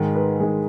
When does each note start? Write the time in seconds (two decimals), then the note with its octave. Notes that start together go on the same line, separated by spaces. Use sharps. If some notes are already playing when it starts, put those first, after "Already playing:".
Already playing: G#2 D#3 G#3
0.15 B4
0.40 G#2 D#3 G#3 G#4